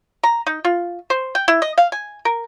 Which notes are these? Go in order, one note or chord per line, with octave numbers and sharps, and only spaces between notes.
A#5
D#4
F4
C5
G5
E4
D#5
F5
G#5
A#4